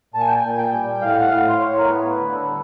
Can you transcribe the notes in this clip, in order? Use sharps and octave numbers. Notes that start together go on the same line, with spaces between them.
A#2 A5
G#5
G5
G#5
A#2
G5
G3
A2 F5
F#5
A2 F5
C5
A2 C#5
A#4
B3 B4
D3
A4
G3